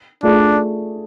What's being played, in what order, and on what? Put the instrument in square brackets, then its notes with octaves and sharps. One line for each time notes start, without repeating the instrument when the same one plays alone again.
[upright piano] A3 F4 G#4 D5 [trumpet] D4